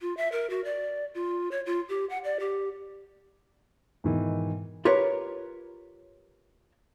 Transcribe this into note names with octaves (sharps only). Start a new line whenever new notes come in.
F4
E5
A#4
F#4
D5
F4
C#5
F4
G4
F#5
D5
G4
G#2 B2 D#3 E3
F4 G4 A#4 B4 C#5